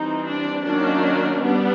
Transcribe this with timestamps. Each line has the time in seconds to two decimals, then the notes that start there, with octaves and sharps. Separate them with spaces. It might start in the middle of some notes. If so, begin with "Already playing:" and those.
Already playing: E3 G3 C4 D#4
0.27 D4
0.65 D#3 F#3 A#3 C#4 D4
1.42 G3 B3 D4